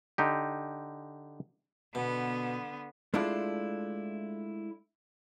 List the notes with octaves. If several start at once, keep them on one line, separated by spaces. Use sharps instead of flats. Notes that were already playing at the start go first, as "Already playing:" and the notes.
D3 D#4 G4
B2 D3 B3
G#3 A3 D4 E4 F4